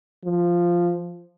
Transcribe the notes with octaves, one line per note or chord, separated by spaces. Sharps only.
F3